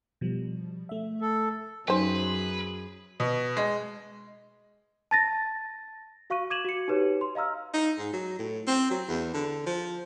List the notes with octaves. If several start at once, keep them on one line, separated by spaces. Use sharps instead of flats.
B2 F3 G3
A3 E5
A4
F#2 F#3 C#4 D#4 G#4 B4 C5
B2
G#3
A5 A6 A#6
F#4 F5 C#6 F#6 D#7
D6 G#6 D#7 E7 F#7
F#4 C#7
D#4 G4 B4 C#5
C6
D#5 F5 A#5 E6 F6
D#4
G#2
F#3
A2
C4
F#3
E2
D3
F3